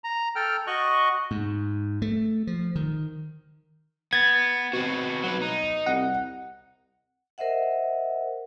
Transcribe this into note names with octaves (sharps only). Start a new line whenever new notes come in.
A#5
A4 G5 F6
F#4 D#5 C#6 F#6
G#2
A3
F3
D#3
B3 G#6 A6
B2 C4 F#4
F#3 B4
D#4
C2 F#5
A#4 C5 D#5 E5 F#5